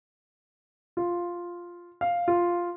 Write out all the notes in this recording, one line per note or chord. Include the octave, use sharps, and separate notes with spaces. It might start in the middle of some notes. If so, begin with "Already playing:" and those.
F4
F5
F4